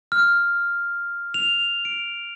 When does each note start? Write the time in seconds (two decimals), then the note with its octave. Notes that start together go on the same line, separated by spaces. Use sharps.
0.12 F6
1.34 F7
1.85 D7